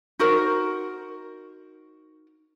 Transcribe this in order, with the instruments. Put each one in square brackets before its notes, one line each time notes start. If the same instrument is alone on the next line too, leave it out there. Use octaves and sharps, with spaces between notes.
[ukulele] D#4 F#4 A#4 C5